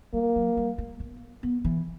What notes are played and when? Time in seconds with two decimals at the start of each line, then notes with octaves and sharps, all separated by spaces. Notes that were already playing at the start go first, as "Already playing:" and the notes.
0.13 G3 A#3
0.36 F#3
0.57 G3
0.78 A#3
1.00 B3
1.43 B3
1.65 E3